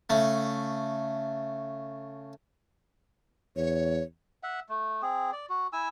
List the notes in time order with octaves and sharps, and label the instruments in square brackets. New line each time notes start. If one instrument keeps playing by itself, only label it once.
[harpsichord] C#3 A3
[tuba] E2 [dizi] C#5
[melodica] E5 F#5
A3
C4 G#4
D5
F#4
E4 G#5 E6